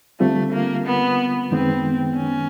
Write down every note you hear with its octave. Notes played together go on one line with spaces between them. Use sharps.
D3 G3 A3 C4 F4
A#3
B3
F#2 D#3 G#3 B3 C4
C#4